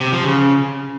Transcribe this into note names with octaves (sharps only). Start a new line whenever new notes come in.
C3
F3
C#3